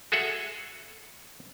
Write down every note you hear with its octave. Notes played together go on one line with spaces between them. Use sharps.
F#4 G#4 A4 E5 F#5